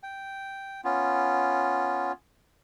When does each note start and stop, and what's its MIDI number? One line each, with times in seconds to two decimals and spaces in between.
0.03 0.81 79
0.84 2.12 59
0.84 2.12 61
0.84 2.12 65